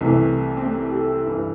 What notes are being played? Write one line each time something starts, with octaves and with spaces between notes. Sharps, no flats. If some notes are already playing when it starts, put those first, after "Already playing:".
C2 C3 E3 A3
C4
A3
G4
A4
G2 E3